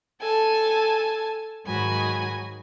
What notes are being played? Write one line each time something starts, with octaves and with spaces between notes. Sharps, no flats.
A4 G#5 A5
G#2 D#3 F#3 F#4 G#5 B5